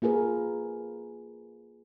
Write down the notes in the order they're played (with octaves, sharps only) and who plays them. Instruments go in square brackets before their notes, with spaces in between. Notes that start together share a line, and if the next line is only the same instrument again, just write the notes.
[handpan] A#3 F4 G#4 A#4 B4